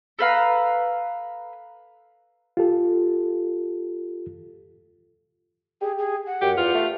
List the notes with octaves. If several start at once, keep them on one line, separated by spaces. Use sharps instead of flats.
A4 B4 F5 A#5
F4 G4 A4
G4 G#4
G#4
F#5
F#2 G4
E2 F4
A3